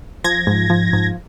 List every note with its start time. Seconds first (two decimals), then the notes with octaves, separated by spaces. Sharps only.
0.24 F3 G#6 A#6
0.47 G#2
0.70 F3
0.93 G#2